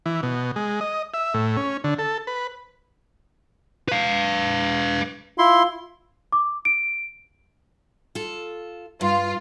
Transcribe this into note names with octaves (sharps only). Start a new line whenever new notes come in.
E3
B2
G#3
D#5
E5
A2
C#4
D3
A4
B4
B4 F5
E4 F4 C6
D6
D7
F4 A4
G2 F4